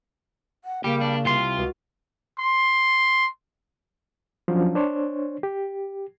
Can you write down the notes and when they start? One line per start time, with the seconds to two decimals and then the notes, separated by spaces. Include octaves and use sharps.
0.64 F#5
0.84 C#3 G3 A#3 G4
1.01 D4
1.25 C2 C3 F4 C6
1.57 C#2 F#4
2.39 C6
4.48 F3 F#3 C#4 D4
4.75 D4 C5 C#5
5.43 G4